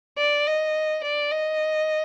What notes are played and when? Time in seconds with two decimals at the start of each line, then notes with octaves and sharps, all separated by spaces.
0.18 D5
0.47 D#5
1.03 D5
1.31 D#5